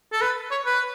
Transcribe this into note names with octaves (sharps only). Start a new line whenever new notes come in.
A4
B4
C#5
B4